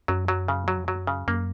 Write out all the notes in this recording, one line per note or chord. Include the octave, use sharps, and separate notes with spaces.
F#2 F#3
F#3
C#3
F#3
F2
F#2 F#3
C#3
F#2 A#3